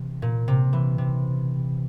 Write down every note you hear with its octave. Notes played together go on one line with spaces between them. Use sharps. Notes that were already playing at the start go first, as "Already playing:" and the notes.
Already playing: C3 E3
A#2
C3
E3
C3